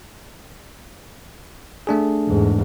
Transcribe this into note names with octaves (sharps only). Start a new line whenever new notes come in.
A3 D4 G#4
E2 G#2